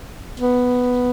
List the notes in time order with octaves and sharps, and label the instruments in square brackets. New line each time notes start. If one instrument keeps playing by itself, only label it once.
[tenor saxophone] B3